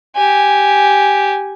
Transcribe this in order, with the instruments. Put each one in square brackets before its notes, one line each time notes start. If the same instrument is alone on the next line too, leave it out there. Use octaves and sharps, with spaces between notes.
[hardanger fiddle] G4 G#5